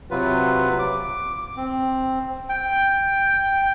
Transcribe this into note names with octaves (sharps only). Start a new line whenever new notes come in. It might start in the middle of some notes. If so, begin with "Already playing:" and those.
C3 F#3 F4 B4
D6
C4
G5